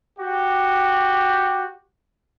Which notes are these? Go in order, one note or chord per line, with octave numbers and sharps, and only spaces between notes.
F#4 G4